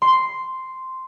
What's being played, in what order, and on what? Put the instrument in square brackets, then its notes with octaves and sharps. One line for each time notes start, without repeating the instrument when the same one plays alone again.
[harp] C6